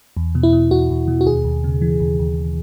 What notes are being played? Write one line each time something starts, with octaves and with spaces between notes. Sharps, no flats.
E2
B2
E4
B2
E2 F#4
E2
B2
F#4
D#2 G#4
D#2
C#3
E3
D#2
D#2